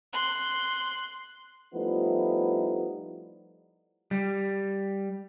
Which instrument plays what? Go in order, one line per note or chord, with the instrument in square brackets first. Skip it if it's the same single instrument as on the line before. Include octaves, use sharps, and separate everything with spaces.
[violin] C6 F#6
[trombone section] F3 G3 A3 B3 D#4 E4
[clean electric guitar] G3